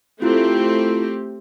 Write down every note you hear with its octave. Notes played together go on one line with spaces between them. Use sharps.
A3 C4 E4 F4 G4